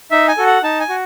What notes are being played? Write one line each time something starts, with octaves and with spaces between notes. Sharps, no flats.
D#4 E5
G#5
F#4 A4
F#5
D#4 A5
G#5
F#4